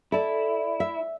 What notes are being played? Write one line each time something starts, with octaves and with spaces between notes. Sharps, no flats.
E4 A4 D5
E5